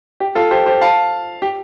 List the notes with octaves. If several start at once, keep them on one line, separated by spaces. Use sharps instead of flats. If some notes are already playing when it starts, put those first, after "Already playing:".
G4
F4 A4
G4 C5
G4 C5
F5 A5
G4